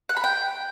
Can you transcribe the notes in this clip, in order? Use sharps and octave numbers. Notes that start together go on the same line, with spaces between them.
F#5
B5
G5